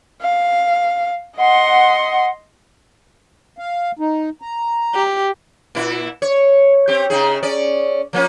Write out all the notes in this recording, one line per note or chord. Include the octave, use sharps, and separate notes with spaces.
F5
D#5 F#5 C6
F5
D#4
A#5
G4
A#2 E4
C#5
C4 G4
C#3 D#4 G#4
C#4 D5
F3 A#3 C#4